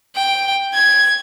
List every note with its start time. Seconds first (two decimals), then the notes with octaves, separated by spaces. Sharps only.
0.16 G5
0.74 G#6